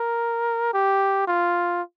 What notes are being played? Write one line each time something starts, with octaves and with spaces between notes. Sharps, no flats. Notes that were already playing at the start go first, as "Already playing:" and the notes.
Already playing: A#4
G4
F4